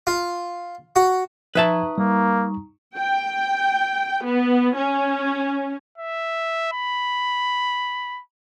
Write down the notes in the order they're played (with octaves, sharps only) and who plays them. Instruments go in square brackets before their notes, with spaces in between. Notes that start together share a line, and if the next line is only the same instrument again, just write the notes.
[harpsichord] F4
F#4
[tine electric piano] F3 G#6 [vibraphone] D#4 A#5 C#6 [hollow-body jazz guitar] B4 E5 A5
[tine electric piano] G3 [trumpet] A#3
[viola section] G5
B3
C#4
[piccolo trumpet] E5
B5